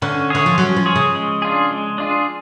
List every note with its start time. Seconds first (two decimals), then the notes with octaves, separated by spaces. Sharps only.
0.02 D3 C#4
0.30 D3 G#4 C#5
0.46 F3
0.58 F#3 C#4
0.76 F3
0.86 G#4 C#5
0.96 C#3
1.15 G#3
1.42 D4 F4 G#4
1.71 G#3
1.98 D4 F4 G#4